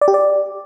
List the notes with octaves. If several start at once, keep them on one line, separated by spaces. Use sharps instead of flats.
D5
G4
D5